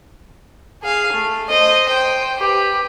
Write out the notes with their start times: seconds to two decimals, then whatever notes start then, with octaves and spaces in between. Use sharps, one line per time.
0.83 G#4 F5
1.12 A3
1.50 C5 D#5
1.89 C5 G5
2.38 G4 B4